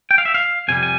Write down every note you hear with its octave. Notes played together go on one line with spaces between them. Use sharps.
G5
F5
E5
F5
F2 C3 G3 G#5
G#5